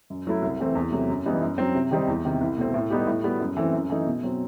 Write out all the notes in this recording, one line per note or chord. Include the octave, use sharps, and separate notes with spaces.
F#2
F#3 A3 E4
C2
C3 E3 A3 C4
E2
C3 F#3 A3
F#2
E3 G3 B3 D#4
F#2
F#3 C4
C3
D#3 G3 C4 D#4
E2
C3 D#3
C2
B2 A3 C4
A2
G3 B3 D#4 G4
A2
G3 B3 F#4
F#2
E3 A3 C4
F#2
E3 A3 D#4
B2
F#3 C4